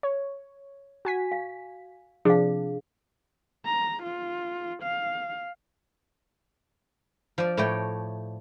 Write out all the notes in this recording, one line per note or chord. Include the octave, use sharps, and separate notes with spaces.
C#5
F#4 G#5 B6
F5
C3 F3 D4 G#4 F5
A#5
F4
F5
F3 D5
A2 A3 C#5 D5 G5